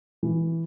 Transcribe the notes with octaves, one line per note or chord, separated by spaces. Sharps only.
E3